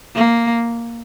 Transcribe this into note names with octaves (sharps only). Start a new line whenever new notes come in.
A#3